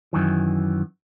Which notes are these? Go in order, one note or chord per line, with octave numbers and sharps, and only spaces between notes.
F#2 D#3 E3